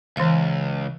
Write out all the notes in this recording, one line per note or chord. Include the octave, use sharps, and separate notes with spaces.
C#2 E3 F5